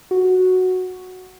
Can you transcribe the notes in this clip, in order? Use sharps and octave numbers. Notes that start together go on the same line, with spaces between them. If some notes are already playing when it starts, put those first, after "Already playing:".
F#4